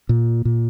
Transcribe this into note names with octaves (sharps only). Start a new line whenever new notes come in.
A#2
A#2